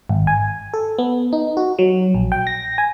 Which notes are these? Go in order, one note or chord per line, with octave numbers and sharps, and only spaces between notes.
G#1
G#5
A4
B3
D#4
F#4
F#3
A#1
G5
A#6
G#5